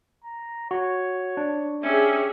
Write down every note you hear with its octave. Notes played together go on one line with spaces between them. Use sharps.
A#5
F#4 C#5
D4
C#4 G4 G#4 E5